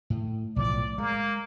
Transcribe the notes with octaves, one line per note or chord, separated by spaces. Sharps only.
A2
B1 A2 F3 D5
G#3 A#3